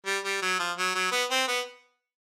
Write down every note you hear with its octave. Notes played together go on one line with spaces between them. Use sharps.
G3
G3
F#3
F3
F#3
F#3
B3
C4
B3